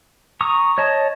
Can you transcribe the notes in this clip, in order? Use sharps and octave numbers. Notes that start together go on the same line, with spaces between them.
A#5 C#6 D#6
C#5 D#5 A5